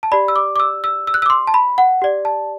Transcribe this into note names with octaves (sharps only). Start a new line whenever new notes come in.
A5
G4 D5 B5
E6
D6
D6
E6
E6
E6
F#6
D6 E6
C6
A5
B5
F#5
G4 D5
A5